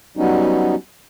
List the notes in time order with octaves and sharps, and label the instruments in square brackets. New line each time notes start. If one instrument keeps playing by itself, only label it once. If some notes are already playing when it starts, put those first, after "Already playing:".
[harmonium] F#3 G3 B3 C#4 D#4